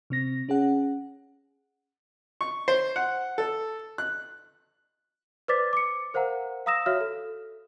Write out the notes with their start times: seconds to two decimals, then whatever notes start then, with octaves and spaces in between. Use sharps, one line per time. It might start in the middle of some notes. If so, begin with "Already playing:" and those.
0.10 C3 C4 A#6
0.49 C#4 G#4 F#5
2.41 C#6
2.68 C5
2.96 F#5
3.38 A4
3.98 F#6
5.48 B4 C5 D5 D6 A6 B6
5.73 D6 C#7
6.14 A#4 C5 F5 F#5 A#5
6.66 F5 A#5 D#6 E6 A#6 E7
6.86 F#4 C#5 E5 F5 F6
7.01 A4